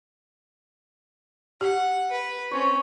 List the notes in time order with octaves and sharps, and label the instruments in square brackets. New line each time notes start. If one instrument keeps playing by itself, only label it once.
[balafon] G4 [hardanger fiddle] F#5
[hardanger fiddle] B4
[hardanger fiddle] C4 C#4 [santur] C#5